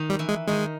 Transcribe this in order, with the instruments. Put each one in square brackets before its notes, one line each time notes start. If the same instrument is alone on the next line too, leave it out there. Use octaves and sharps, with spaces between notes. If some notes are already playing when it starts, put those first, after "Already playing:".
Already playing: [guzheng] D#3 D#4
[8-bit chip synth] G3
[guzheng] E3 E4
[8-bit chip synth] G#3
[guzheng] D#3 D#4 [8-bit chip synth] G#3